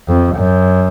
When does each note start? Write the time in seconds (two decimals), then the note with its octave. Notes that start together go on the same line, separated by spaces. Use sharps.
0.08 F2
0.37 F#2